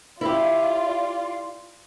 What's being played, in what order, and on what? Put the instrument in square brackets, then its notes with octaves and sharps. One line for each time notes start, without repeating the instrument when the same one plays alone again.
[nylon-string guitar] E4 G4 [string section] F4 D5